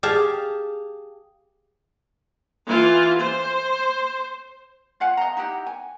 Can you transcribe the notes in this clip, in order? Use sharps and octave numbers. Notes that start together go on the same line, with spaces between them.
G4 G#4 F5 A5
E3 F4
C5
F4 F5 F#5 G#5
D#5 A#5
D#4 E4 G4 F#5
G#5